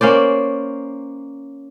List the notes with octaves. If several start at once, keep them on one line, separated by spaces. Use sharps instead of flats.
A#3 C#4 C5 D5